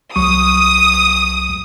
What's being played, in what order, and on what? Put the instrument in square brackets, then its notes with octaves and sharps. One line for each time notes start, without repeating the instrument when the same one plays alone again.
[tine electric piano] C2 F#3 C#6 [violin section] D#6